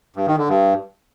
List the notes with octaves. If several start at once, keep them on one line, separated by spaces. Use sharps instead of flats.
G2
D#3
D3
G2